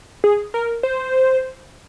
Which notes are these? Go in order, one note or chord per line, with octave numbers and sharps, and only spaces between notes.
G#4
A#4
C5